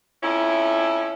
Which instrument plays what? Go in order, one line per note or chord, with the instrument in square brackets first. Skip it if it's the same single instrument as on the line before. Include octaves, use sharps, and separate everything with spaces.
[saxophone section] F2 C#4 E4